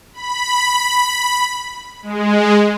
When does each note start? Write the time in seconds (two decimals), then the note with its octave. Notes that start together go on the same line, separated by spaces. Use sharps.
0.14 B5
2.03 G#3